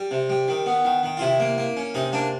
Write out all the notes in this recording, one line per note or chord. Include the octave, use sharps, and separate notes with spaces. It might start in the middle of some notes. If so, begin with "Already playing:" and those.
Already playing: G3
C3
G3
D#3
B3
D#3
D#3
F4
C3 E4
A#3
A#3
C#4
C3 D#4
A#3 D4